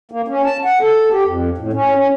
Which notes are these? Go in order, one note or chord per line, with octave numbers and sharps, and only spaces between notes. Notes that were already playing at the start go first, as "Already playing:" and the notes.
A#3
C#4
A5
F#5
A4
G4
F2
A2
C#4
C#4